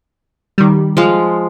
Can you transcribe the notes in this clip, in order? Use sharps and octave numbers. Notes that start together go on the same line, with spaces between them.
D#3 G3
F3 G#3 F5